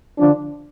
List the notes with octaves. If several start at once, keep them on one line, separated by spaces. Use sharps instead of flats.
D3 F3 D4